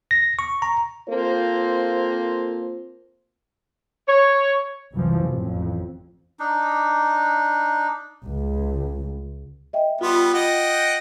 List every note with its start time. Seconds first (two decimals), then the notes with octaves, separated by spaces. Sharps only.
0.11 A#6
0.39 C#6
0.62 A#5
1.09 A#3 C4 F4 A4 A#4 C5
4.07 C#5
4.93 C2 F#2 E3 F3
5.27 A1 F2
6.40 D4 D#4
8.26 C#2
9.73 D#5 E5 G5
10.01 G3 B3 F4 C6
10.34 D#5 F#5 G5